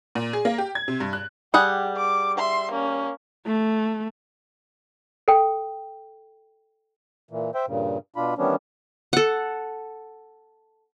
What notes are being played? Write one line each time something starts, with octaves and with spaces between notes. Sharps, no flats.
A#2
G#4
A#3
G4
G#6
C3
G2
F#6
G3 G4 G#4 F#5
D6
E5 C6
A#3 C#4
A3
A4 G5
A#2 E3
C5 E5 G5
G2 A#2 C#3
B2 D4 F4 B5
D#3 E3 G3 B3 C#4 D4
A4 F#5